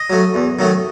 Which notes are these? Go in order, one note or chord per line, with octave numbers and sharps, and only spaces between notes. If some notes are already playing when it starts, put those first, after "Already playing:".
Already playing: D#5
F#3 A3
E2
D#3 F#3 A3